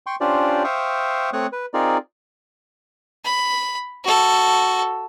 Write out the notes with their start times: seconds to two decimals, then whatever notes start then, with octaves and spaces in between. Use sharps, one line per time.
0.06 G5 C6 C#6
0.21 C#4 D4 F4 G4 C5 D5
0.64 C5 E5 F5 G5 C#6 D#6
1.33 A3 C4 C#5 C#6 D#6 F#6
1.52 B4
1.74 C4 D#4 F4 G#4 A#4 D5
3.25 B5
4.04 F#4 A4